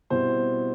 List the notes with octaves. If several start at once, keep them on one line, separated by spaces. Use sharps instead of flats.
B2 G3 C4 E4 C5